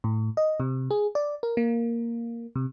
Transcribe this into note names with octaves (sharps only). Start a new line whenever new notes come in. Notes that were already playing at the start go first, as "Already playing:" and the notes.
A2
D#5
C3
G#4
D5
A#4
A#3
C3